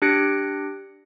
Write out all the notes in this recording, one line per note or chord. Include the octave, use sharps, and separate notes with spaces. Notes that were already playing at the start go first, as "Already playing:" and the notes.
D4 G4 F#6 A#6 C#7 D7